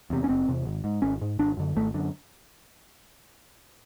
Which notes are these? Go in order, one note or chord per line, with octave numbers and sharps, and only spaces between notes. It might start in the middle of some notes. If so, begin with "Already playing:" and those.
E2 C3
C#4
F#1 C4
E2 C3
G#1
G#2
G#1 C#4
G#2
G#1 D4
F#2 D3
G#1 A3
F#2 D3